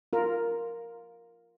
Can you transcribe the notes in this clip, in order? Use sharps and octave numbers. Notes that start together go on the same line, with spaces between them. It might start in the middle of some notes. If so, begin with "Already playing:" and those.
F4 A#4